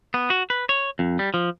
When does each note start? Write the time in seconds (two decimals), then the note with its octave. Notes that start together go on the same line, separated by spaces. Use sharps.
0.14 B3
0.30 F#4
0.50 B4
0.69 C#5
0.99 F2
1.19 G3
1.34 F3